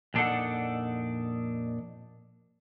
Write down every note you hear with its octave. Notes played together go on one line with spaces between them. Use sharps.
F2 A#2 D4 D#4 A4 F#5